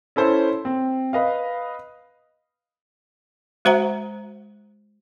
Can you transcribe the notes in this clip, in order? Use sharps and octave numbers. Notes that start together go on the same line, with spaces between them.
C#4 E4 A4 C5
C4
B4 D#5 F5
G#3 F#4 C5 E5 F#5 A#5